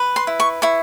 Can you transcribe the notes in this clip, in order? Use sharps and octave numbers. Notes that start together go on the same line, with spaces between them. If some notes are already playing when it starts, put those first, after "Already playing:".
Already playing: B4
C6
E4
C#6
E4 C#6